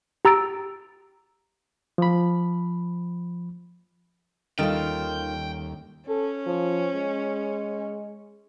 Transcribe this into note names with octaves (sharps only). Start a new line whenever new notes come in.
G4 A#5 E6 A6 D7
F3 B5
D#2 D#3 G3 C#4 F4 A4 G5
C#4 A4
F3
G#3